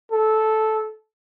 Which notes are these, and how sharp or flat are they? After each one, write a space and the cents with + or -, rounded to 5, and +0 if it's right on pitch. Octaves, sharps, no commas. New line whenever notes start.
A4 -10